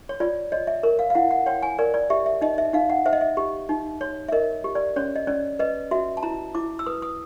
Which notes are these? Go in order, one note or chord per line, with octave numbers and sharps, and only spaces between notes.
C#5
F4 D5
C#5 D#5
E5
A#4
F5
F5
E4 F#5
F#5
C#5 G5
G#5
A#4 D5
D5
G4 E5
E5
D#4 D#5
E5
D#4 F5
F#5
C5 E5
D#5
E5
G4
D#4
C#5
E5
A#4 D#5
G4
D5
C#4 C#5
D#5
C#4 D5
B4 D#5
F#4 E5
A5
E4 A#5
E4 D6
E6
B4 D#6
D#6